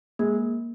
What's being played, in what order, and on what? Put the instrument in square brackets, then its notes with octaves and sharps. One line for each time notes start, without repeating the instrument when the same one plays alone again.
[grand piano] G#3 G#4 [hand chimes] A#3